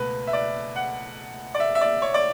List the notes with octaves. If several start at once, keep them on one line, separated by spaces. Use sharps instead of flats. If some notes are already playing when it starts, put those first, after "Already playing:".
Already playing: C#2 B2 A3 B4
E5
D5
F#5
D5
E5
E5
D5
C#5
D5